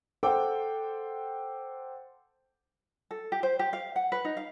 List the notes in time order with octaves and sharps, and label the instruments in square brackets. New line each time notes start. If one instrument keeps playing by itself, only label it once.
[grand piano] A4 C5 F#5 G5 D6
[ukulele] A4
G4
C5
G4
F5
F#5
B4
D#4
F5